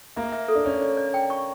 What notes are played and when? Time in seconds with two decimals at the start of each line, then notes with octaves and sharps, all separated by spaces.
0.16 A#3 E5
0.32 E5
0.48 A4
0.55 D4
0.65 C#4 D5
0.82 D5
0.97 D5
1.14 G5
1.30 C#6